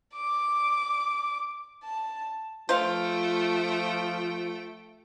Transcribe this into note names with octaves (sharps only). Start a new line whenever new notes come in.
D6
A5
F3 A3 F4 C5 F5 G5